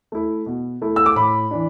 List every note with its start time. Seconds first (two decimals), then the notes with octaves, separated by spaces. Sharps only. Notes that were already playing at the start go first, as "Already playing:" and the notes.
0.12 A3 E4
0.46 B2
0.82 A3 E4
0.96 E6
1.06 D6
1.16 A2 B5
1.51 E3 D4